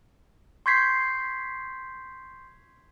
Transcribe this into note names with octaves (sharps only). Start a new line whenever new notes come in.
C6 C#6 G6 G#6 B6 C7